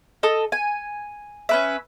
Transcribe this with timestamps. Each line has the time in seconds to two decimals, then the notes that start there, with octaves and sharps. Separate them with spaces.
0.23 A4 D#5
0.52 G#5
1.49 C#4 B4 E5